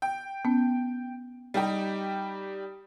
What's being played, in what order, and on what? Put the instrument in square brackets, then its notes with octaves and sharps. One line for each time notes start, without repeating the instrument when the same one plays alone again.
[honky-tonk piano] G5
[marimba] B3 C#4
[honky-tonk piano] G3 D#4 G4